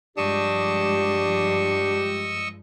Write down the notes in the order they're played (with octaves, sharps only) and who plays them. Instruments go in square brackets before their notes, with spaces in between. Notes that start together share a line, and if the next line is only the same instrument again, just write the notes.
[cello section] G2 F3 G#3 [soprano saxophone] D4 [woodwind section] G4 [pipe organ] D#5 C#6 E6